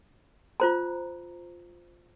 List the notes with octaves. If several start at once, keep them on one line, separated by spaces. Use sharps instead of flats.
F4 C5 A#5